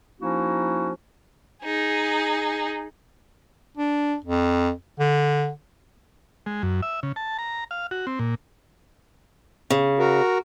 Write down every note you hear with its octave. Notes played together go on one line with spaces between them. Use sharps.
F3 A#3 C#4 D#4 E4 F#4
D#4 G#4
D4
F2
D3
G#3
F#2
E5
C#3
A5
A#5
F5
F#4
C4
A#2
C#3
F#4 A#4